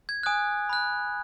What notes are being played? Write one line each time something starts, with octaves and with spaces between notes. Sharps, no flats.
G#6
G#5 D#6 F#6
B5 F#6